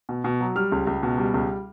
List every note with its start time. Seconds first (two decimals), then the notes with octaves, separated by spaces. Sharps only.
0.09 B2
0.24 B2
0.41 F#3
0.56 G3 F6
0.72 C#2
0.87 C#2
1.03 B2
1.18 G3
1.34 C#2